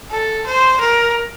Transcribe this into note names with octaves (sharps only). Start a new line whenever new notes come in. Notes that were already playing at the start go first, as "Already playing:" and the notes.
A4
C5
A#4